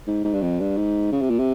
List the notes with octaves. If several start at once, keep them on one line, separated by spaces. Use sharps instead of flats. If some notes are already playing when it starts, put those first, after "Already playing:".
G#2
G#2
G2
F2
G2
G#2
C#3
C3
A#2
C3